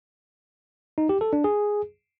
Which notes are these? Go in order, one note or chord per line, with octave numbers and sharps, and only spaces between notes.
D#4
G4
A4
D4
G#4